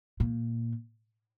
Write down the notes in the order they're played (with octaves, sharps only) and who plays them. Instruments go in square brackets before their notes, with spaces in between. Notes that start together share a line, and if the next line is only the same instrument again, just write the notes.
[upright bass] A#2